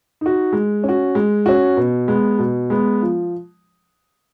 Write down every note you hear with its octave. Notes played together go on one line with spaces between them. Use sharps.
D#4 F#4
G#3
C#4 F#4
G#3
C#4 F#4
B2
G#3 B3
B2
G#3 B3
F3